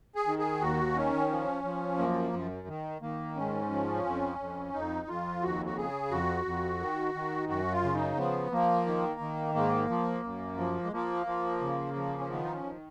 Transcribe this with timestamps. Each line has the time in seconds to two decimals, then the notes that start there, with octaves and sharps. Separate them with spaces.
0.15 G#4
0.27 D#3
0.39 G#4
0.61 D#2 F#4
0.96 D#3 C#4
1.30 F3
1.64 F3
1.98 F#2 A#3
2.33 F#2
2.68 D#3
3.02 D#3 A#3
3.36 G#2 C#4
3.70 F3
4.05 F2
4.39 F2
4.73 F2 D#4
5.08 F2 F4
5.42 D#2 F#4
5.66 F#4
5.77 C#3 G#4
6.11 F2 F#4
6.46 F2
6.80 D#3
7.14 D#3
7.49 F#2 F#4
7.72 F4
7.83 C#3
7.94 D#4
8.17 F3 B3
8.52 F3 A#3
8.86 D#3
9.20 D#3
9.55 G#2 A#3
9.89 F3
10.23 F#2
10.58 F3
10.84 G#3
10.92 F3 A#3
11.26 F3
11.61 C#3
11.96 F3
12.19 C#4
12.29 D#3 B3
12.44 D#4
12.52 C#4
12.64 D#3